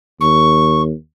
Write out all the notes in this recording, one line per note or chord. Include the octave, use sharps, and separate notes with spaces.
D#2 C#6